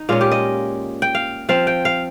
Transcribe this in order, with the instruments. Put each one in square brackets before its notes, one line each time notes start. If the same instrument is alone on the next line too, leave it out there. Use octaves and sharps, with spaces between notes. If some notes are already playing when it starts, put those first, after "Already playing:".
Already playing: [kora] D#4
A#2 G#3 C#4 F4
G4
D#5
G5
F5
F3 C4 F5
G5
F5